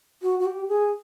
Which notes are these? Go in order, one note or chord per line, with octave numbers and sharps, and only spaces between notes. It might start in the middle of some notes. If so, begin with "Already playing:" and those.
F#4
F#4
G4
G#4